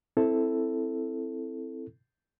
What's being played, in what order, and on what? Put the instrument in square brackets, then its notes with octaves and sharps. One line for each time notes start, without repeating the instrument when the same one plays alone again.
[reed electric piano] C4 E4 A4